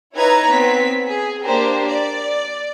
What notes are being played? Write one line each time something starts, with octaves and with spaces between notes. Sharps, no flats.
D#4 E4 B4 C#5 A#5 G#6
B3 C4 B6
G#4
A#3 D4 G4 A#4 C5
D5